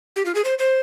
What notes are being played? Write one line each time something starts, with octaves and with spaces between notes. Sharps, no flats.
G4
F4
G#4
C5
C5